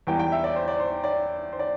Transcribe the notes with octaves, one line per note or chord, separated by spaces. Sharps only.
E2 E3 G3 G5
G5
E5
D5
C5
D5
C5
D5
C5
D5